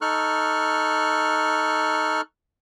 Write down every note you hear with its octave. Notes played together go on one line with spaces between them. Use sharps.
D#4 A4 C#6 F6 F#6